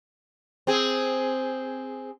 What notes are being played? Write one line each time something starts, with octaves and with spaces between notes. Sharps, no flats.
C4 G#4